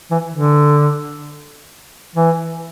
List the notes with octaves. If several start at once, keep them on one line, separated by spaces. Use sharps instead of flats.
E3
D3
E3